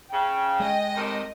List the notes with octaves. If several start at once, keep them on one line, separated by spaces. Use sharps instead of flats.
C#3 G5
G#3 D#5 D#6
A2 C3 D#3